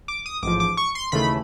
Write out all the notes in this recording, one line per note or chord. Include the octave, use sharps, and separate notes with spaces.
D6
D#6
A1 G#2 F3 D6
D6
C#6
C6
D#2 C#3 E3 A3 B5